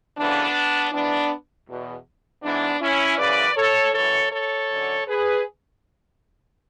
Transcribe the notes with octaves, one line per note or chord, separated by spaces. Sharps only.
D2 C#3 E3 B3 D4
G#2 E3 B3 D4
E2 B2
G#2 E3 B3 D4
C#4 E4
F#2 C#3 E3 B4 D5
A4 C#5
F#2 E3 A4 C#5
A4 C#5
F#2 D3
G#4 B4